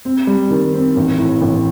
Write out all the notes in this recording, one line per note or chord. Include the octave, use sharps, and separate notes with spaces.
C4
G3
D#3
C4
A1
A2
A1